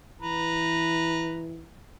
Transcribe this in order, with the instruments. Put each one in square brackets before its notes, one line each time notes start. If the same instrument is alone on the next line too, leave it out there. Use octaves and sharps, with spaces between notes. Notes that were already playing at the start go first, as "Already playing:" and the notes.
[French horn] E3 [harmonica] B4 A#5